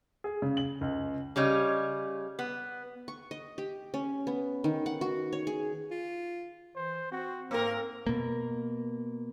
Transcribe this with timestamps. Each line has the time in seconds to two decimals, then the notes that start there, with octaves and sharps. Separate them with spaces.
0.24 G#4
0.42 C#3
0.57 F#7
0.81 C#2
1.36 C#3 G3 C#5 D#5
2.39 B3
3.08 C#6
3.31 D#5
3.58 G4
3.94 C#4
4.27 B3
4.64 D#3
4.86 F#5
5.01 F#4
5.33 C#5
5.47 G#4
5.91 F4
6.76 E3 C5
7.12 C4 F#4
7.51 G#2 A#3 C4 A#4
8.07 B2 A#3